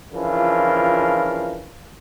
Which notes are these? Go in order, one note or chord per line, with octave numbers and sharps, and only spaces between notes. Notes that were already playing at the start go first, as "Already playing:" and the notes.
C#3 E3 F3 D4 F4 A#4